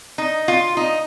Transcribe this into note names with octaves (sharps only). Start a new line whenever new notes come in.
D#4
F4
D#4